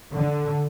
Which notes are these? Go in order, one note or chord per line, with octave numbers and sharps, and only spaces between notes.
D3